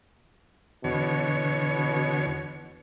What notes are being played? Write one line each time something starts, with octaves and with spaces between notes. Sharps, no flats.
E2 B2 D3 C#5